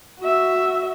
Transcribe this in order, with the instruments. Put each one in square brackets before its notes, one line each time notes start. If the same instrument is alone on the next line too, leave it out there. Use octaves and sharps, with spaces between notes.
[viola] F#4 E5